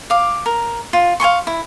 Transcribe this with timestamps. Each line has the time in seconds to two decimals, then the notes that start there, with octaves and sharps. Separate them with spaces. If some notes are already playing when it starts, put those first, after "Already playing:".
0.10 F5 D6
0.46 A#4
0.93 F4
1.20 F5 G#5 C6 C#6
1.47 E4